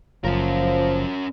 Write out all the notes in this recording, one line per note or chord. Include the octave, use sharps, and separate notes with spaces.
F#1 F3 C#4 A#4